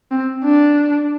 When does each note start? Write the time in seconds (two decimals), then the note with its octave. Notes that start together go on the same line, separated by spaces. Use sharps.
0.11 C4
0.44 D4